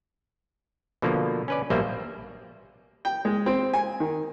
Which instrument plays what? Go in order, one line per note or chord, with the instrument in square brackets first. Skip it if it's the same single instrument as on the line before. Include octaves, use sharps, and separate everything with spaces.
[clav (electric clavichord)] B2 D3 F3 A#3
C#4 B4 D5
A#1 B2 G3 A#3 C5 E5
[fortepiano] G5
G#3
C4
G#5
D#3